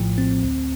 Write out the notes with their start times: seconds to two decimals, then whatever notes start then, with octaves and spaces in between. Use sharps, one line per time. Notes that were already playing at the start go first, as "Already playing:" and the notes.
Already playing: A#1 A2 F3
0.18 C4
0.43 D2